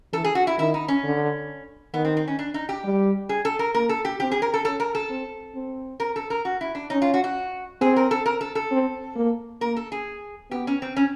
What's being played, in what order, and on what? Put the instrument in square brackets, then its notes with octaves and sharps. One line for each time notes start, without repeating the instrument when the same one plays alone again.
[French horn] E3 [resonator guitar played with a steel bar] A4
[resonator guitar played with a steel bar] G#4
F#4
E4
[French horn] D#3 [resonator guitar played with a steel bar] E4
[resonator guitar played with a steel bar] D#4
C#4
[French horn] D3
[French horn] D#3 [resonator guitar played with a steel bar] B3
[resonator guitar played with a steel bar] C4
C4
C#4
D4
D#4
G4
[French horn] G3
[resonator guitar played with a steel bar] G#4
A4
A#4
[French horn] A#3 [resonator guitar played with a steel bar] A#4
[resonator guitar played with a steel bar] A4
G4
[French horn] C4 [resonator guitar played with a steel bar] G4
[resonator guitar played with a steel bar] G#4
A#4
A4
[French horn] C#4 [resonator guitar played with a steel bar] A4
[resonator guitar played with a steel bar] A#4
A4
[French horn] C4
C4
[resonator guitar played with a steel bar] A#4
A4
A#4
F#4
E4
D4
[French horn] C#4 [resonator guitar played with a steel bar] D#4
[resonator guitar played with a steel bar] F4
F#4
F#4
[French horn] C4 [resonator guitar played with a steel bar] G#4
[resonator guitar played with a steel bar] A#4
A4
A#4
A4
A4
[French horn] C4
A#3
[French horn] A#3 [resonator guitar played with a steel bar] A#4
[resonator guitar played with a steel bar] A4
G#4
[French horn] B3 [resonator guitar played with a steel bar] G4
[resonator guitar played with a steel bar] C#4
C4
C#4